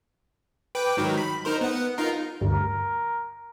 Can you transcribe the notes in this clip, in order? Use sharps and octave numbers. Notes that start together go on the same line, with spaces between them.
B4 G5 D6
G#2 D#3 F#3
B5
D#4 A#4 C5
B3 F#5
D#4 F4 A#4
D2 G2 A#4